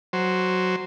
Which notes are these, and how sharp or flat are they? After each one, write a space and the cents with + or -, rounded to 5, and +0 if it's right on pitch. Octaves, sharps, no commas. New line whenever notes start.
F#3 +0 C5 +0